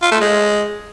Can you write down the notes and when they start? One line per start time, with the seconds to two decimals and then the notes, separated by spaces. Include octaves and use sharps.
0.02 F4
0.11 A3
0.20 G#3